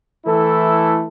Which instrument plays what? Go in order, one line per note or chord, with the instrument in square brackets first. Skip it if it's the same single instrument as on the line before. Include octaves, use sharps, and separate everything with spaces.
[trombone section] E3 A3 E4 A4